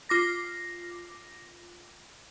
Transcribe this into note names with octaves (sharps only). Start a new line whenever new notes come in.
F4 D6 A#6